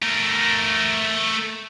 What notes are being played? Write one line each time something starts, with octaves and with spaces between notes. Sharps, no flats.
A3 A#4